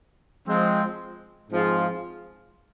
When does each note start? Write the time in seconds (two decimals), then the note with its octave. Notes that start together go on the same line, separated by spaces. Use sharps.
0.48 F3 G#3 C4
1.51 G#2 F3 C4 F4 G#4